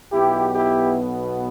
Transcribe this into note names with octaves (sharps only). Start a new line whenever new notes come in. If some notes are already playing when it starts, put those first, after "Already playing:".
B1 B2 B3 E4 G4
E4 G4